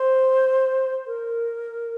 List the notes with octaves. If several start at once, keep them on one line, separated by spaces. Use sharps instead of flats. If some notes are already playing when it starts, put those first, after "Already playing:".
Already playing: C5
A#4